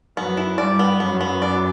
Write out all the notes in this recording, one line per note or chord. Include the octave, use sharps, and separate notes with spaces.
F#2 F#3 B3
E4
G2 G3 D5
B3
F#2 F#3 B3
B3
D5